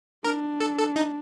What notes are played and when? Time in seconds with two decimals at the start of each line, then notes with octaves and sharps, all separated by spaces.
0.24 D4 A#4
0.60 A4
0.78 A4
0.96 D#4